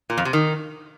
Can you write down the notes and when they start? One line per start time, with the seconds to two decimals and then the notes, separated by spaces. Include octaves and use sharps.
0.10 A#2
0.18 F2
0.25 C3
0.33 D#3